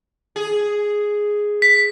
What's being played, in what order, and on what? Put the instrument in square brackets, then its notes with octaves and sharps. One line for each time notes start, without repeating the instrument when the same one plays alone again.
[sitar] G#4
[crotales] B6